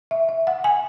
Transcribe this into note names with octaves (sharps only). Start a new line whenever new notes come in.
E5
E5
F#5
G#5